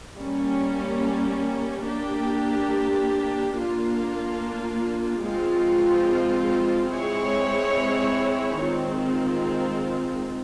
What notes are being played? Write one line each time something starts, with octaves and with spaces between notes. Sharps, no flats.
G3 A#3 C#4
A#3 D4 G4
A#3 D4 F4
F3 G#3 C4 F4
G#3 C4 E4 G#4 C#5
D#3 G#3 C4 F4